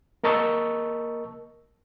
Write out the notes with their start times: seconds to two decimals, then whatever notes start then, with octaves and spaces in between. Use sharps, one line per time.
0.24 A#3 A#4 D#5 A5 C#6 E6